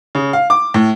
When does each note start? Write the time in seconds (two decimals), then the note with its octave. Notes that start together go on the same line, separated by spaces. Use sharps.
0.15 C#3
0.33 F5
0.50 D6
0.74 A2